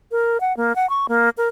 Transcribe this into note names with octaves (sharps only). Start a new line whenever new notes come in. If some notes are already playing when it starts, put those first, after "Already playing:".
A#4
F#5
A#3
F#5
C#6
A#3
A#4